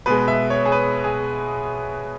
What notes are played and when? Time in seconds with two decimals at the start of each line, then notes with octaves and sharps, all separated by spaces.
0.06 B2 G#3 B4
0.28 E5
0.50 C#5
0.66 G#4
0.72 B4
1.04 G#4